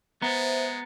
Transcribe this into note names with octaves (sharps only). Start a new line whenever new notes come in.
G#3 B3 C5 E5 A#5 A6